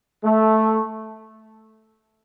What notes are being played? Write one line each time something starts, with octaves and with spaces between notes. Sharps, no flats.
A3